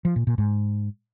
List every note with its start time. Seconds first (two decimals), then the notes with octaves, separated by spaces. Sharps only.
0.05 F3
0.16 A#2
0.27 A#2
0.38 G#2